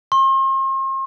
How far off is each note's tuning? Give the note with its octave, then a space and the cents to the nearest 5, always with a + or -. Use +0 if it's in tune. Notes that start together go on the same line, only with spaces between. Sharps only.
C6 +40